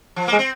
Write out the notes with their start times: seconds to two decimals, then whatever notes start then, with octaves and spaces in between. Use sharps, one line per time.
0.16 F3
0.28 G#3 A#3
0.39 C4